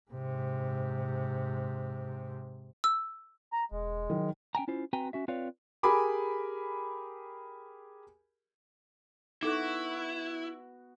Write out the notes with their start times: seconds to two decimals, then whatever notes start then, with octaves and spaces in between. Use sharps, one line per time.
0.11 G#2 C3
2.84 E6
3.53 A#5
3.72 E1 G#3
4.10 D#3 F#3
4.55 C#4 G5 G#5 A#5
4.68 C#4 E4 F4 C5
4.93 C4 F#4 B4 G5 G#5 A#5
5.13 C#4 F#4 E5
5.28 C4 F4 B4 C#5 D5 F5
5.83 G4 G#4 A#4 G#5 B5 D6
9.43 B3 D#4 E4 F#4 A4 D6